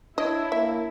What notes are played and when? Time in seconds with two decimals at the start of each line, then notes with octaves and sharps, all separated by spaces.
0.18 D4 E4 C#5 D#5
0.52 A#3 E5